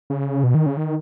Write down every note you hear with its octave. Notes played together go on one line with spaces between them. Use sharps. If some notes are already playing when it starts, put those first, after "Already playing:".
C#3
B2
D#3
C#3
D#3